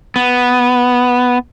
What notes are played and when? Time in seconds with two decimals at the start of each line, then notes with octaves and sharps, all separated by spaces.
0.16 B3